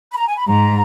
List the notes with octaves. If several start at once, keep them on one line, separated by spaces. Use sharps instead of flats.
B5
A#5
G#5
B5
G#2 A#5